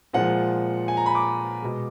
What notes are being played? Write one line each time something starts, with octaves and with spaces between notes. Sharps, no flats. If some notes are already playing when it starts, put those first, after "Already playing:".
A#2 F3 G#3 F#5
G#5
A#5
B5
D6
B2 G#3